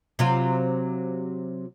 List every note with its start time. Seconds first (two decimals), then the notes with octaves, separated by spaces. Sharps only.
0.19 C3 F#3 F4